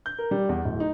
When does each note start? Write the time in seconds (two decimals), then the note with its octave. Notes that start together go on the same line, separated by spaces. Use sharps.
0.06 G6
0.19 A#4
0.31 G3
0.49 E2
0.65 D1
0.80 D#4